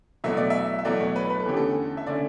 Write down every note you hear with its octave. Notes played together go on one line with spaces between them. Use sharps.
E2 B2 F#3 A3 E5
D5
E5
E5
E2 B2 F#3 A3 D5
C#5
B4
B4
A4
E2 D3 A3 C#4 G4
A4
E5
D3 A3 C#4 D5